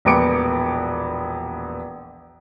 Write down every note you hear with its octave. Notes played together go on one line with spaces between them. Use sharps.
E1 A#1 B3 D6 C#7 D7